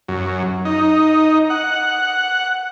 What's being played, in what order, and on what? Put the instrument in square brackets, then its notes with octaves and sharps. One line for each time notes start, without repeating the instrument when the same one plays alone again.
[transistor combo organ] F#2
D#4
F#5